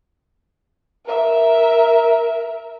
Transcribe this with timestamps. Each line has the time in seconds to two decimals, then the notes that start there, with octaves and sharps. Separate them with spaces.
1.05 A#4 E5